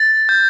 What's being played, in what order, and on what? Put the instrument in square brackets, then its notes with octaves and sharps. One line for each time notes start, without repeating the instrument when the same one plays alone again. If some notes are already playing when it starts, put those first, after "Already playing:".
Already playing: [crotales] A6
G6